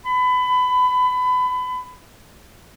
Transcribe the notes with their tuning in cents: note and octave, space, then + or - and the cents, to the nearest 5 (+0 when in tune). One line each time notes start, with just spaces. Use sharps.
B5 +25